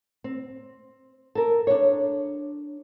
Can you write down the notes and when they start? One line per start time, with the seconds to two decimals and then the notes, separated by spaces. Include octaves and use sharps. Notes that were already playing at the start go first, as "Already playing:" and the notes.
0.24 C4
1.35 A4 A#4
1.67 D4 C#5